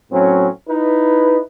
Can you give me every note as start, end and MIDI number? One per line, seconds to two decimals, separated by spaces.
0.12 0.48 45
0.12 0.48 54
0.12 0.48 60
0.12 0.48 61
0.69 1.40 63
0.69 1.40 64
0.69 1.40 71